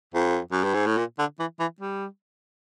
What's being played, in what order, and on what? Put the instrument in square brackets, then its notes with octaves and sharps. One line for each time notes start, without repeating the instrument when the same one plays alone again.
[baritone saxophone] F2
F#2
G2
G#2
A2
A#2
D3
E3
E3
G3